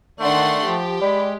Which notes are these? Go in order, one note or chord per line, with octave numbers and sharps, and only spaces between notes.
D#3 A3 D4 F#5 C6
F3 G4
G#3 D5 B5